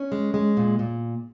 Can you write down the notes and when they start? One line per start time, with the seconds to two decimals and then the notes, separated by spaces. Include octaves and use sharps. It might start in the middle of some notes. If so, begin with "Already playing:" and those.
Already playing: C#4
0.12 G#3
0.34 G#3
0.57 A#2
0.79 A#2